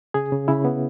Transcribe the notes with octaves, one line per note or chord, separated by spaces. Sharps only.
C#3 G#4
C#3
C#3 E4
B3